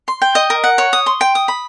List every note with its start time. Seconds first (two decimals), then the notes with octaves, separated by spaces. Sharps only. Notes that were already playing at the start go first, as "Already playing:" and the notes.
0.08 C6
0.22 G5
0.35 D#5
0.50 A#4
0.64 F#5
0.78 C#5
0.93 D#6
1.06 C6
1.21 G5
1.35 D#6
1.48 B5